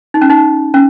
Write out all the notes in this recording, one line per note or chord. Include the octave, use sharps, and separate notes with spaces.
D#4
C#4
D#4
C#4